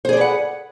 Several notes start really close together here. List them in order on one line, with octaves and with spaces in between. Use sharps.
C5 G#4 D5 B4 F#5